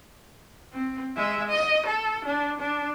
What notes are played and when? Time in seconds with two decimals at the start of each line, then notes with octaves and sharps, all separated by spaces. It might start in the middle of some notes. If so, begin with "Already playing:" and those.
0.73 C4
1.17 G#3 E5
1.49 D#5
1.86 A4
2.25 D4
2.59 D4